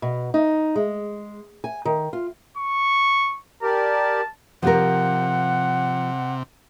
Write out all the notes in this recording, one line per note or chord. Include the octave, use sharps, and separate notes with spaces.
B2
D#4
G#3
G#5
D#3
F4
C#6
G4 A#4 D5 A5
C3 F3 G4 A#4 F#5